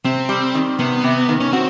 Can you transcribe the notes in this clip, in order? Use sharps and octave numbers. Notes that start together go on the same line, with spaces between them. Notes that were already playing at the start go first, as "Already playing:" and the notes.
C3 C4
G3
D#3
C3 B3
C3
D#3
C#4
C4 F#4